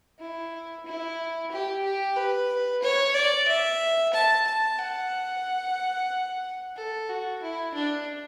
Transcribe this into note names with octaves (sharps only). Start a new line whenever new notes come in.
E4
E4
G4
G4
B4
C#5
D5
E5
A5
A5
F#5
A4
F#4
E4
D4